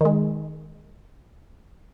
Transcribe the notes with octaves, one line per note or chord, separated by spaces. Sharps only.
D#3 G#3